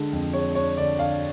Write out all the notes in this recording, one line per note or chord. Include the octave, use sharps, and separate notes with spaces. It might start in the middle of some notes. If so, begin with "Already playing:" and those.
Already playing: D3 G#3 D4
F2
G#3 C#5
D4 C#5
D3 D5
D3 F5